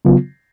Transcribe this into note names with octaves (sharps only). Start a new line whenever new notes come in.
C#3 F#3 B3 F4